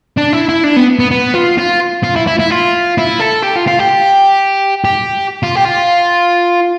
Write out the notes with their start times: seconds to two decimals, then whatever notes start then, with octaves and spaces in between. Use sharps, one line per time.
0.17 D4
0.32 E4
0.49 E4
0.64 D4
0.76 B3
0.99 B3
1.11 B3
1.34 F4
1.58 F4
2.03 F4
2.16 E4
2.27 E4
2.39 E4
2.50 F4
2.98 E4
3.21 A4
3.43 G4
3.56 F4
3.68 F4
3.79 G4
4.85 G4
5.43 F4
5.56 G4
5.65 F4